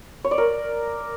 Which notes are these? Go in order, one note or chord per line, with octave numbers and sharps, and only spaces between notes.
C#5
D5
A#4